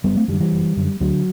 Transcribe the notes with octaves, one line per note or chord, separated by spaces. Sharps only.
F#1 G3 B3
A3 C4
F#2 D3 E3 G3
E3 G3
F#1
F#2 D3
D2 D3 F#3